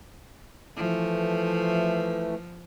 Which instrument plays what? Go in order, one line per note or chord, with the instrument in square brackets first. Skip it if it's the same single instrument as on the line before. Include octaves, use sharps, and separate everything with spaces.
[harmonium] E3 A3 [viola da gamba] F3